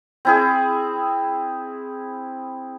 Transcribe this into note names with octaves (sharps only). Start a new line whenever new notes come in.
C4 E4 G#4